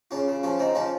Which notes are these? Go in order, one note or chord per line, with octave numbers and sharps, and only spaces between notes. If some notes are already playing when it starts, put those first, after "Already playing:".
C#3 C#4 F4
C#3
F3 C#4 F4
C#3 C4 D#4
F3 C#4 F4